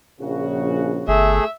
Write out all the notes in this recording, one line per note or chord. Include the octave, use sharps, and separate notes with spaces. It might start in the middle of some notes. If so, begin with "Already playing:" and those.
A#1 C#3 F#4
G1 A3 G#4 E5